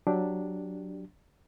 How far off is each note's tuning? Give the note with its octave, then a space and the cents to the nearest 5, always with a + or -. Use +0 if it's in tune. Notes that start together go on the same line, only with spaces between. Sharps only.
F#3 +0 D4 +0 G4 +0